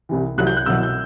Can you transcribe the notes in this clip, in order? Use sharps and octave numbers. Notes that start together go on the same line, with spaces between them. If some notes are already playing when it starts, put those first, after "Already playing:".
C2 C3 E3
C2 C3 F#3 F#6
G6
F#6
C2 B2 F#3 E6
G6